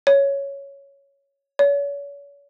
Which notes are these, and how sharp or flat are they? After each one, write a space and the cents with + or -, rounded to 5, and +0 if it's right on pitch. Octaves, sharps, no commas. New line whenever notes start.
C#5 +5
C#5 +40